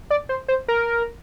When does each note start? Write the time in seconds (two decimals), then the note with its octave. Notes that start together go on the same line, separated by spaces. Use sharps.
0.10 D5
0.29 C5
0.48 C5
0.68 A#4